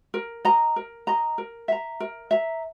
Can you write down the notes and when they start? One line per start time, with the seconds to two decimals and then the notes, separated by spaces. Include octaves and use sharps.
0.14 A#4
0.45 D#5 A#5
0.76 A#4
1.07 D#5 A#5
1.38 A#4
1.68 E5 A#5
2.00 A#4
2.31 E5 A#5